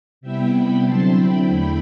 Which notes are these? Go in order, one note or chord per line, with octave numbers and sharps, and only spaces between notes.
C3 G3 B3 E4 E5 G5
G5 B5
D3 F#3 C4 E4 A5 C6
G5 B5
E2 D3 A3 E4 G5 B5